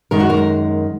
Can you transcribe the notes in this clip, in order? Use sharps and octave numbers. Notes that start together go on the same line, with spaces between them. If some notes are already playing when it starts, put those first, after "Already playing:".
F#2 D#3 G#3 A#4
F#4
A#4